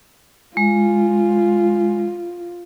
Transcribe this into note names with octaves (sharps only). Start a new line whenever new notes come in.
G#3 F4